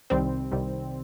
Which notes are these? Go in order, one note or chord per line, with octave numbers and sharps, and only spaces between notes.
C2 C3 D#3 G3 C4
C2 C3 D#3 G3